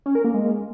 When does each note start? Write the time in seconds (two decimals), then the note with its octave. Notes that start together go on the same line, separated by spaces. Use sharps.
0.06 C#4
0.15 A#4
0.25 A#3
0.34 G#3